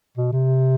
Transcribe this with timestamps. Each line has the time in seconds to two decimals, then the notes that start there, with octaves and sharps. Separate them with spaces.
0.17 B2
0.33 C3